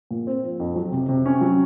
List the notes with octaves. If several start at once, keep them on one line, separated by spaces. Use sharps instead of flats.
A#2
C4
F3
F2
F#3
C3
C3
C#4
F#3